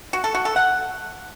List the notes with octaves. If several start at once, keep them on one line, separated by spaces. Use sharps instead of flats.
F#4
A4
F#4
A4
F#5